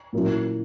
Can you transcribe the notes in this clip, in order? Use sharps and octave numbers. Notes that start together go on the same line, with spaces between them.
A#2 F#3 A#3 C#4 E4